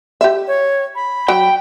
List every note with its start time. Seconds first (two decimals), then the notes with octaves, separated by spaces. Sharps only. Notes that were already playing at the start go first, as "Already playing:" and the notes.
0.21 G4 E5
0.47 C#5
0.95 B5
1.28 F#3 G5